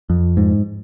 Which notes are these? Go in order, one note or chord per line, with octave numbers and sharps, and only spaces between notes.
F2
G#2